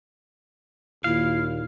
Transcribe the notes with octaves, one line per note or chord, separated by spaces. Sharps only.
D#2 A#2 E4 F5